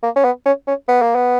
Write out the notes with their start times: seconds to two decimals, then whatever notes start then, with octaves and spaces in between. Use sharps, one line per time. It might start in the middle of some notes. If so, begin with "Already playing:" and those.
0.03 A#3
0.16 C#4
0.24 B3
0.46 C#4
0.67 C#4
0.88 B3
1.02 A#3
1.15 B3